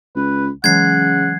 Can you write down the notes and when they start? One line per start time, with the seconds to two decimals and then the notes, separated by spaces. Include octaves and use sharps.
0.16 C#2 B4
0.64 C#3 E3 F#3 G#3 F#5 G#6 C7